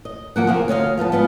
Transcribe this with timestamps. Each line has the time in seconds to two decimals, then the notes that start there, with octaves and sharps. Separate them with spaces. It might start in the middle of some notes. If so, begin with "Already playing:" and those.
0.05 D#5
0.36 D#2 F3 A#3 F#5
0.47 A#3 C4 F4 G#4
0.68 D2 C#5 D#5 F5
0.97 F3 B3 G#5 A5
1.12 G3 G#3 B3 F4